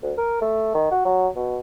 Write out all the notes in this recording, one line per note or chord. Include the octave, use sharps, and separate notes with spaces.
D2
A#4
A3
D#3
F#4
F#3
B2